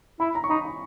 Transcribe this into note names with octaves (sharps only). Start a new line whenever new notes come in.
E4 B5
A#5
C#6
D#4 B5
B5